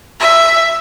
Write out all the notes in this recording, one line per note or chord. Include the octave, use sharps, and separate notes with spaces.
E5